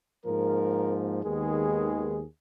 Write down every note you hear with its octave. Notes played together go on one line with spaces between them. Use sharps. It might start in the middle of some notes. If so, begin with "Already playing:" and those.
G#2 F3 A#3 A#4
D#2 D#3 G#3 B3 G#4